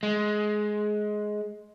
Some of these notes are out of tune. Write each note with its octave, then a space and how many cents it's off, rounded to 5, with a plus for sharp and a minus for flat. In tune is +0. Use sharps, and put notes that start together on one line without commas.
G#3 +15